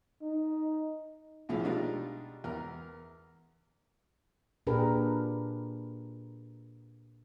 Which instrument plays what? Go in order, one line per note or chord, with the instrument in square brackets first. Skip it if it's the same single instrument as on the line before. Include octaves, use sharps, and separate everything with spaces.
[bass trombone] D#4
[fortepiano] C2 A2 E3 F3 G#4
B2 G3 G#3 D4 D#4 F4
E2 A#4
[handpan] A#2 D4 G4 G#4 A#4 B4